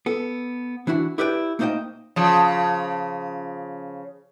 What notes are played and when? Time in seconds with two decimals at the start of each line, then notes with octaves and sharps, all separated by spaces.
0.06 B3 A4
0.87 E3 D4 E4 F#4
1.18 E4 G4 B4 D5 D#5 G5
1.59 A3 A#3 D#4 C5 D#5 G5
2.16 C#3 F3